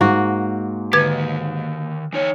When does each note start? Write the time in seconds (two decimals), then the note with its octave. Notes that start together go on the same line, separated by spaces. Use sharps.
0.01 G#2 A#3 F#4
0.93 D3 D#3 G4 B4 G#6
2.13 E3 D#4 C#5